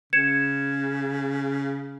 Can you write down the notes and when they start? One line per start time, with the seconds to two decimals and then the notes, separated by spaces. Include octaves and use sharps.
0.13 C#3 G#6 C#7 E7